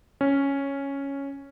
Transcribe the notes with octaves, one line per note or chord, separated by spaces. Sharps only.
C#4